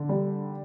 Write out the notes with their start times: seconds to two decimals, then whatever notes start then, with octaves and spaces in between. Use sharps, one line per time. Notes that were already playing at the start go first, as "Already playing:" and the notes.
Already playing: D3
0.09 G3